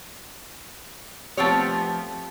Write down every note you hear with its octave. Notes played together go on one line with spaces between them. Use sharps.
F3 A3 B3 C4 G4 C#5